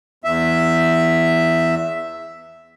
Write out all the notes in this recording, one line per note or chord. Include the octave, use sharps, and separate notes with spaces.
E2 E5